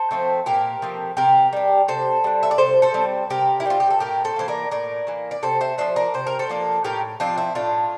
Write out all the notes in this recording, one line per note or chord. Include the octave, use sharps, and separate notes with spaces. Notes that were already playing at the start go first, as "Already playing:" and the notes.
Already playing: A4 C5
F3 A3 C4
A#2 G4 A#4
F3 A3 C4
C3 G4 A#4
G3 D4
C3 A4 C5
G3 D4
E5
D5
C3 A4 C5
A4 C5
G3 C4
C3 G4 A#4
E4
G3 C4 F4
G4
A4
A2 G4 A#4
A4 C5
E3 A#3 C5
A#4 D5
A2 A#4 D5
E3 A#3
D5
C3 A4 C5
C5 E5
F3 A#3 D4 C5 E5
A#4 D5
C3 C5
A#4
A4 C5
F3 A#3 D4
A2 G4 A#4
F3 C4 D4 F4
E4
A2 D4 F4